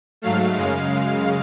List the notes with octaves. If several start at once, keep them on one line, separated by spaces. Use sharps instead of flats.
G#2 F#3 A3 F5
F#2 C#3 G#3